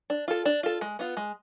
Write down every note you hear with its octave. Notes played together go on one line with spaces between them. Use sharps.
D4
F4 A4
D4
F4 A4
G#3
B3 F4
G#3